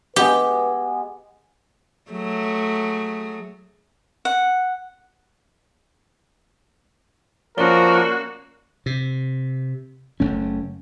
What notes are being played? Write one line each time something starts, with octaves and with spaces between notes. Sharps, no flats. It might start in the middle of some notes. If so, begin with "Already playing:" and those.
G#3 B3 G4 B4 E6
F#3 A3 G#4
F#5
F3 A#3 C#4 F#4 A#4 D5 G7
C3
F#1 A3 C#4